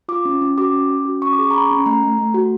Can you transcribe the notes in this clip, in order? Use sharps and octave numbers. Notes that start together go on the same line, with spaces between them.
F4 D6
C#4
C#4
F#4 D6
C#4
C#4
F#4
C#4 C#6
D6
G#4 C#6
A#5
C#4 B5
C#4
A3 A#5
A3
A3
F#4